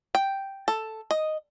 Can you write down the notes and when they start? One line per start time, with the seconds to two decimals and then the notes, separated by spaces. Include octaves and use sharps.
0.15 G5
0.68 A4
1.11 D#5